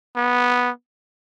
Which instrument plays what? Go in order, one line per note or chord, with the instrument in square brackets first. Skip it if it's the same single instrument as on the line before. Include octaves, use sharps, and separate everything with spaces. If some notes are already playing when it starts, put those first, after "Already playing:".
[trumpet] B3